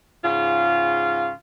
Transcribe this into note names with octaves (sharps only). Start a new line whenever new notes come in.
G#2 C#3 F4